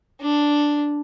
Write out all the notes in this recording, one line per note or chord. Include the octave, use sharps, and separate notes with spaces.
D4